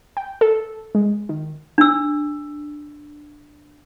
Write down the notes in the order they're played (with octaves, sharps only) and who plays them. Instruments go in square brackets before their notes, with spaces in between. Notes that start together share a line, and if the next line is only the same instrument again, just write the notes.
[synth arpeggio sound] G5
A4
G#3
D#3
[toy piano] D4 E6